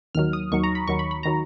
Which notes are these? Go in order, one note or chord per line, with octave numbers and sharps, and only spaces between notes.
D#2 D#3 F#3 F6
D#6
D#2 D#3 F#3 C#6
A#5
B5
D#2 D#3 F#3 C#6
B5
B5
D#3 F#3 A#5